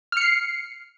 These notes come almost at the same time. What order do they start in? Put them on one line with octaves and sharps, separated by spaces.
F6 C#7 C7